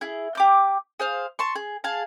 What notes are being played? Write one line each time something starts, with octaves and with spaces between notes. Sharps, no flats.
E4 G#4
G4 D6 G6
G#4 C5 F5
A5 C6 C#6
G#4
G#4 F5 A5